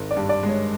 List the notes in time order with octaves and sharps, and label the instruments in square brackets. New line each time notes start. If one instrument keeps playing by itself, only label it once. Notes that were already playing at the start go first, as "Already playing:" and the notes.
Already playing: [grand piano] G#1
[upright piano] D5
[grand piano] G2
[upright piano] D5
[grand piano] G#3
[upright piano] C#5